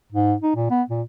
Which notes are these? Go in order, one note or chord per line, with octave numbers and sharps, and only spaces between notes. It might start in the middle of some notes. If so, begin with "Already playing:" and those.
G#2
D#4
A#2
B3
A#2